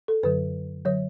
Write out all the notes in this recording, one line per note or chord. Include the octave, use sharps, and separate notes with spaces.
A4
F#2 D3 F#3 B4
D3 F#3 C#5